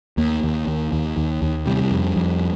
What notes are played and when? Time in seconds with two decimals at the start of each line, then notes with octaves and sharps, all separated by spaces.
0.17 D#2 A#3
0.43 D#2
0.67 D#2
0.92 D#2
1.17 D#2
1.42 D#2
1.66 C3 G3
1.91 F2
2.16 F2